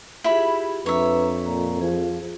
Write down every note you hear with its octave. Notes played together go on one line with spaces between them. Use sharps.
E4 F4 G4 G#4 B5
F2 D4 B4 C#5 E5 A#5
A#2 A#5
F3 G#4